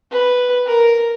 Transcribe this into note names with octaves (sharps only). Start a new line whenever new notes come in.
B4
A#4